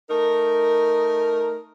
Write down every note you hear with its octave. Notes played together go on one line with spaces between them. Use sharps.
A3 D#4 A#4